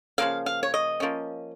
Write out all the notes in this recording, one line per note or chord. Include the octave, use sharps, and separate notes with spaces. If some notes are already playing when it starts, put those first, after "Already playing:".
C#3 F3 A#3 F5
F5
C#5
D#5
F3 A#3 C#4